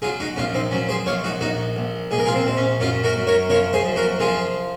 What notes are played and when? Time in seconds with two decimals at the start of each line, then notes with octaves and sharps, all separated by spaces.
0.02 F#3 F4 G#4
0.20 D#4 F#4
0.36 A#1 C#4 F4
0.54 C4 D#4
0.71 F#3 C#4
0.89 G#4 C5
1.06 A#1 C#5 F5
1.24 D#4 F#4
1.41 A#1 D#4 F#4
1.76 A#1
2.11 A#1 G#4
2.19 A#4
2.26 F4 G#4
2.35 C4
2.46 A#1 C4
2.57 C#4
2.80 F#2 C#4 F4
3.04 F#4 A#4
3.16 F#2
3.27 A#4 C#5
3.50 F3 A#4 C#5
3.73 G#4 C5
3.85 F#2
3.96 F#4 A#4
4.20 F3 F4 G#4